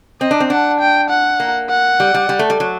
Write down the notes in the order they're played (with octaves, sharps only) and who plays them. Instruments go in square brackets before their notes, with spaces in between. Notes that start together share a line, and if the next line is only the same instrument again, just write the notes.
[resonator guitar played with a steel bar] C4 [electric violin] D#5
[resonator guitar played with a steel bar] D4
C4
[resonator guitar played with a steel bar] D4 [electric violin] F#5
[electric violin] G5
F#5
[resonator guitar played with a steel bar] A#3
[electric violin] F#5
[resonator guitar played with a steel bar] G3
G3
G3
A3
G3
F#3